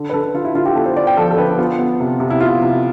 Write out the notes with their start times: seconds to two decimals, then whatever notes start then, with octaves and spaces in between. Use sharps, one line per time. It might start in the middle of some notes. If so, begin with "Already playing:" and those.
Already playing: D3
0.10 B4
0.13 D3 A4
0.34 D3 F4
0.45 E4
0.55 D3 F4
0.66 G4
0.75 B3 A4
0.86 C5
0.96 B3 D5
1.07 G5
1.17 F3 A4
1.31 A4
1.38 D3 B4
1.58 B3 F4
1.79 B3
2.00 C3
2.20 C3
2.30 E4
2.41 B3 F4
2.61 C3